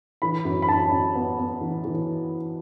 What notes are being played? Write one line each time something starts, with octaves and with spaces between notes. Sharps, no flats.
E3 B5
F#2
B5
F#2 A5
F#2
B3
B3
E3
E3